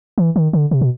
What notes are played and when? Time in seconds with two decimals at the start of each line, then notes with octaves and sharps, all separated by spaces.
0.18 E3
0.36 D#3
0.53 D3
0.71 C3
0.81 B2